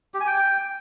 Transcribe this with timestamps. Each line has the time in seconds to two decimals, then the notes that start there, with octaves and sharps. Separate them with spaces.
0.14 G4
0.21 G#5
0.27 G5